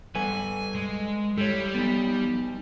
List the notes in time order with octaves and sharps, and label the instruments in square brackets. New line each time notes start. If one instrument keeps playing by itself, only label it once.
[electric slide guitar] G3 A4 B4 [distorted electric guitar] G#5
[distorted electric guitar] G#3
[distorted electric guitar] G3 [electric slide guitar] A4 C#5
[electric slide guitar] B3 D#4